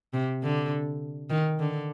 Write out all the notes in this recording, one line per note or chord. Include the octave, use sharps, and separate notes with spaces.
C3
D3
D#3
D3